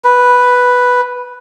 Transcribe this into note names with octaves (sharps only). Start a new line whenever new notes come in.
B4